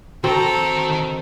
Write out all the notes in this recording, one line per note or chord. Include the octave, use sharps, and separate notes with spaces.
D#3 C4 F#4 A4 A#5